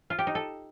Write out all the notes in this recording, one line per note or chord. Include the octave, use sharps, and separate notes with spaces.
F4
G4
D#4
A4